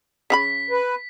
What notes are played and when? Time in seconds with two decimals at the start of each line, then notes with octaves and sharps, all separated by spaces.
0.30 C#3 F4 B5 B6
0.70 B4